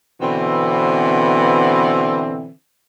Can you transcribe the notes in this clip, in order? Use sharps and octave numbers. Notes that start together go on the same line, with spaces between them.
B2 D3 E3 C4